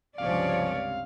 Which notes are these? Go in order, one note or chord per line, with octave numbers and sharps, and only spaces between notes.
C#2 G2 C3 F3 C#4 C#5 D5 F5